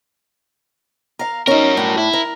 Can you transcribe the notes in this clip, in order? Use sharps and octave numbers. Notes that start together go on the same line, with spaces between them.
A#4 F5
C#4 D#4 F#4 A#4
A2 D4
E4
A#4